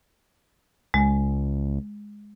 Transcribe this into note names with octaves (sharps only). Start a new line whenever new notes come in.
C#2 G#3